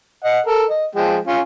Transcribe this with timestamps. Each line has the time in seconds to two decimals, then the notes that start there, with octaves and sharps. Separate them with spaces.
0.24 D#5 F#5
0.47 A4 A#4
0.70 D#5
0.95 F3 G#3 G5
1.27 C#4 F4